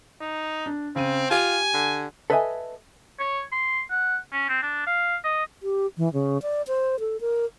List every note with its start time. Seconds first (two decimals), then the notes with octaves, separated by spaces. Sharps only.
0.21 D#4
0.66 D4
0.96 C#3 C4 D#7
1.31 F4 G4 G#5
1.74 D3
2.30 A4 B4 D#5 E5 G5 G#5
3.19 C#5
3.52 C6
3.91 F#5
4.33 C#4
4.49 C4
4.62 D4
4.87 F5
5.25 D#5
5.63 G4
5.98 E3
6.13 C#3
6.42 D5
6.68 C5
7.00 A4
7.21 A#4